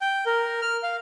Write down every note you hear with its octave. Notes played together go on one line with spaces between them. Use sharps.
G5
A#4
F6
F5